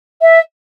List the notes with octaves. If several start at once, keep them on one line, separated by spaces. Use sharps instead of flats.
E5